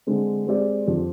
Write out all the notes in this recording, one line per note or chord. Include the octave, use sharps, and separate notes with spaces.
D3 G#3 C4
G#3 C4 G4 D5
F2 D3 F3 C4 G4